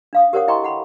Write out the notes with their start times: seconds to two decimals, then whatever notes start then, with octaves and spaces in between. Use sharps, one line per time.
0.13 D4 F5 D#6
0.33 G4 A#4 C5 C#5 F#5 D#6
0.48 E4 D#5 G5 A#5 C6 C#6
0.63 A4 F#5 B5